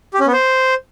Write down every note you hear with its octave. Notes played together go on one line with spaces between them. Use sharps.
G4
C#4
B3
C5